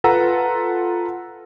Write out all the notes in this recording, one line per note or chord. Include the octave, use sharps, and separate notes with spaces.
F4 A4 B4 F#5 A#5 E6